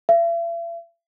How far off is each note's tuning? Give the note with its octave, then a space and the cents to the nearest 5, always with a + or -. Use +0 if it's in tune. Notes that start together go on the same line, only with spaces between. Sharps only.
E5 +45